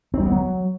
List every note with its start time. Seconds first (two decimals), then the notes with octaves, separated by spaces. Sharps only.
0.14 C4
0.20 G3
0.26 B3
0.32 F#3